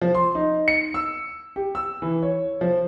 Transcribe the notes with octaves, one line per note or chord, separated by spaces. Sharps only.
F3
C6
D#4
C#7
E6
G4
E6
E3
C#5
F3